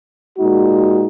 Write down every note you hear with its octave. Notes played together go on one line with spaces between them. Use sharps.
A#2 G#3 D#4 F#4